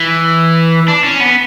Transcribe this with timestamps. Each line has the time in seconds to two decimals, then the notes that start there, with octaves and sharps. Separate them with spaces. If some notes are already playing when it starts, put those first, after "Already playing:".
Already playing: E3
0.88 D4
1.04 C#4
1.20 B3